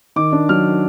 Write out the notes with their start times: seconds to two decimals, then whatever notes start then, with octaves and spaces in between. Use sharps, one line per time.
0.16 D#3 D6
0.32 D4
0.49 F#3 F6